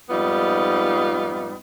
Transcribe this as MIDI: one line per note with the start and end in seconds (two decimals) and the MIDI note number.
0.10 1.55 41
0.10 1.55 44
0.10 1.55 55
0.10 1.55 59
0.10 1.55 63
0.10 1.55 65